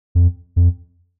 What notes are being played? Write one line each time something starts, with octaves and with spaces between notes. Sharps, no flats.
F2
F2